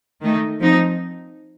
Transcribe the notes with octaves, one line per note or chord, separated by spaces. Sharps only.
D#3 A3 D#4
F3 C4 D#4